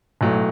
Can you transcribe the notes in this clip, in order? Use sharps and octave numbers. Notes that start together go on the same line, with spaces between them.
B1 A2 F#3 A3